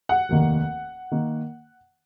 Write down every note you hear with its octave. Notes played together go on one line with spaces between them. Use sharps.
F#5
F1 D#2 D#3 A#3
D#3 A#3